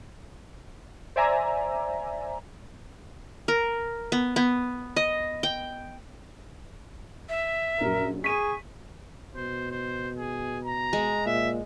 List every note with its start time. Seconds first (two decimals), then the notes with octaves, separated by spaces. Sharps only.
1.16 C5 D5 E5 G#5 A#5
3.48 A#4
4.12 B3
4.36 B3
4.96 D#5
5.43 G5
7.29 E5
7.81 A#1 F#2 A#4
8.24 G#4 C#6 B6 D#7
9.35 B2 C5
9.71 C5
10.18 G#4
10.65 A#5
10.93 G#3
11.26 A#2 E5